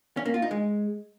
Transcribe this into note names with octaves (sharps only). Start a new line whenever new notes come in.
C#4
A#3
F4
D#4
G#3